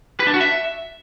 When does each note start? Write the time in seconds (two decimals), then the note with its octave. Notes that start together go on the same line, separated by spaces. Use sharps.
0.20 B4
0.27 D4
0.34 F#4
0.41 E5